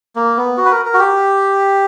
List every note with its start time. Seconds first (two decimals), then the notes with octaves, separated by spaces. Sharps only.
0.16 A#3
0.37 B3
0.57 F#4
0.65 B4
0.71 A#4
0.85 A#4
0.94 F#4
0.99 G4